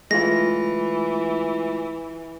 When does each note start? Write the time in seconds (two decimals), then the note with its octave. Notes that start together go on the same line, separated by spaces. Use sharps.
0.11 E3 G#3 A3 F4 A#6